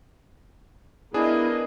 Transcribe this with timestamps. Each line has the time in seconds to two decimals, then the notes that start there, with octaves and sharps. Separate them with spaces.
1.14 B3 D4 E4 G#4 A#4 D#5